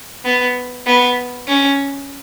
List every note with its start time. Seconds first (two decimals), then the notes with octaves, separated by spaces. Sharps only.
0.25 B3
0.86 B3
1.47 C#4